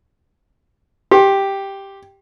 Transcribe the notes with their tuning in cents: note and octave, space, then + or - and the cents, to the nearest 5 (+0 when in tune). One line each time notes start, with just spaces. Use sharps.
G4 +0 C6 +35